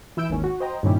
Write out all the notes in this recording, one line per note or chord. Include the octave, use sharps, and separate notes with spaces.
E3 E4 E6 G6 D7
G#1 D#2 C#4
F#4
C5 D#5 G5 A#5
G2 A#2 D#3 C#4 E4 G4